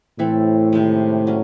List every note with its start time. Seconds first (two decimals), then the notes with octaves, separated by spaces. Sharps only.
0.19 A2 E3 C4 E4 A4
0.73 C3 D#3 G#3
1.27 F#3 C#4